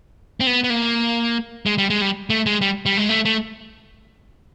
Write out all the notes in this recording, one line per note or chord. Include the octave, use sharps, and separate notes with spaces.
C4
B3
B3
A#3
G#3
G3
G#3
G3
A3
G#3
G3
G3
G#3
A3
A3